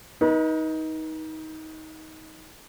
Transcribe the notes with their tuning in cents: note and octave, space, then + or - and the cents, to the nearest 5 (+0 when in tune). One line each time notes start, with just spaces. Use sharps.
D#4 +20 B4 -40